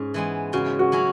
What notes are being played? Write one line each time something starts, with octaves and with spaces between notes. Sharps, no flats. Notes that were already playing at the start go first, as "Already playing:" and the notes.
Already playing: G#2 C#4
E3 G#3 B3
C#3 F#4
F#4
F#3 C#4 E4